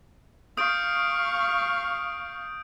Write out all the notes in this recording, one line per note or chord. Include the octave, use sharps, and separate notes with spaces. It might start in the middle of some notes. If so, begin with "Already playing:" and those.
F5 C#6 D#6 G6 D7